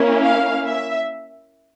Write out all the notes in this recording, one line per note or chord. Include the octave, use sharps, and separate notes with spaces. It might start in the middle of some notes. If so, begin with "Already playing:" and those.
Already playing: A#3 C#4 E4
F5
E5